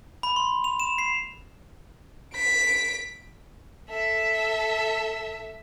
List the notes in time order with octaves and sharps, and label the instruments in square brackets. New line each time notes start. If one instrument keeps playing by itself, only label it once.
[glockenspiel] B5
C6
F7
E7
C7
[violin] B6 D7
A4 E5